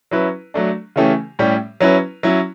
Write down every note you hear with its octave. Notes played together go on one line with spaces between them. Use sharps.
F#3 C#4 E4 B4
F#3 A3 D4
C#3 E3 A3 C#4 G4
A2 G3 C#4 G4
F#3 C#4 E4 B4
F#3 C#4 E4